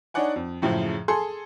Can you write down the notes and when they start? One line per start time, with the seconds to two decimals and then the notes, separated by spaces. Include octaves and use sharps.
0.14 D4 D#4 C#5 D5 F#5 G#5
0.36 F2
0.62 F#2 A2 C#3 F3 G#3
1.08 G#4 A4 G#5 C6